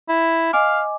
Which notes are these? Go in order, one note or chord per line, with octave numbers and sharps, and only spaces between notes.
E4
D#5 F5 G#5 D6